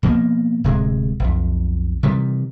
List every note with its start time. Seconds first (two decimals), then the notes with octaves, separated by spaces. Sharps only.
0.03 B2 F3 F#3 A#3
0.64 D1 C3 G#3
1.20 B1 F2
2.03 C3 D#3 E3 G3